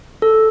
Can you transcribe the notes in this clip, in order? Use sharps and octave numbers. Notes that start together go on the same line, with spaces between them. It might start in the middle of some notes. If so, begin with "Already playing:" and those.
A4